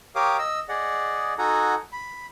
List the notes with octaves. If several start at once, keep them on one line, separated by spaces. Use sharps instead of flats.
G4 A#4 C#5 F5 D6 D#6
D#5 E6
G#4 D5 D#5 F#5
D#4 F#4 A4 F#5 G#5 A#5
B5